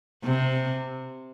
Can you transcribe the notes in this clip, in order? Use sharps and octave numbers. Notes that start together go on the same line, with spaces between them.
C3